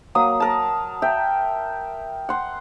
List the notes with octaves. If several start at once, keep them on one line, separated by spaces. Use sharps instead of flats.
F#3 A#3 D#6
A#4 A5
E5 G5
F#5 C6